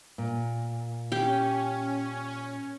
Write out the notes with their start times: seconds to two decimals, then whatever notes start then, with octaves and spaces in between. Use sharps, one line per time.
0.18 A#2
1.12 C#4 G4